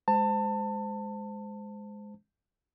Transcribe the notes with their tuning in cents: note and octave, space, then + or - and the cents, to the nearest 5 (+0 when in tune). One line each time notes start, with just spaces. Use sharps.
G#3 +0 C5 -20 A5 +25